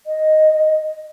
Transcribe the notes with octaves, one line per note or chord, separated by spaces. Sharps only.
D#5